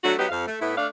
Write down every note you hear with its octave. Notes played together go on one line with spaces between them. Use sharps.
F#3 A3 D4 F#4
F#3 B3 D#4 G4
F2 F5
A3
A2 B3 E4
A3 D4 F5